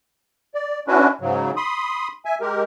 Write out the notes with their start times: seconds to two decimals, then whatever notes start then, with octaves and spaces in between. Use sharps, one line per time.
0.54 D5
0.88 C#4 D4 E4 F#4 B4
1.21 G#2 C#3 F#3
1.57 B5 C6 D#6
2.25 E5 G#5
2.41 G#3 G4 A#4